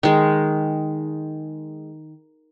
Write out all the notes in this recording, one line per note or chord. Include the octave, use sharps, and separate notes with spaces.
D#3 G#3